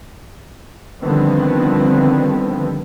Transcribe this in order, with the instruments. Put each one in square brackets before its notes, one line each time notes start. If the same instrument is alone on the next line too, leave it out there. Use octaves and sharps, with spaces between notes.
[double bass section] D3 D#3 F3 G3 B3 C4